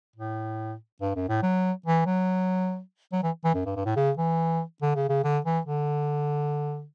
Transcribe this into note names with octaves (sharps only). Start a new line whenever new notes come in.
A2
G2
F#2
A2
F#3
E3
F#3
F#3
E3
E3
F#2
G2
G2
A2
C#3
E3
D3
C#3
C#3
D3
E3
D3